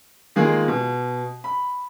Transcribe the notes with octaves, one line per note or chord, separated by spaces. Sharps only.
D#3 G#3 A#3 F4 G#4
B2
B5